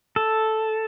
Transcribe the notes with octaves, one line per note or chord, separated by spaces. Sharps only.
A4